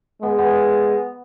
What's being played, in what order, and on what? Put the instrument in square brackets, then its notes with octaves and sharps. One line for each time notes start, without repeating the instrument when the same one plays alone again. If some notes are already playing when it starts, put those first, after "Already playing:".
[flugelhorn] G#3 [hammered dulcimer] B3
[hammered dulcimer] B3